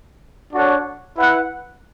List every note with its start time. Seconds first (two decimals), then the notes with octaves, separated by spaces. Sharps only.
0.54 D4 F#4 A4 C#5 F#5
1.18 E4 B4 F#5